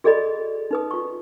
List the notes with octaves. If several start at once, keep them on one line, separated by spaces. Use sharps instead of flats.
F#4 G#4 A4 D5 D#5 B5
D#4 B4 D#6
F4 C#6